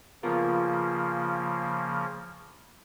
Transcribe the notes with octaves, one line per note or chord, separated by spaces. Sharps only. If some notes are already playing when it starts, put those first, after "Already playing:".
C#3 F3 A#3 B3 F4 A#4